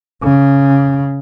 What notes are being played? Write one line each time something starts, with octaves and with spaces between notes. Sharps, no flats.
C#3